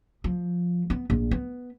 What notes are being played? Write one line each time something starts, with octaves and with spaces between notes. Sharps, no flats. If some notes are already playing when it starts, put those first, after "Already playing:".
F3
B3
A#1
B3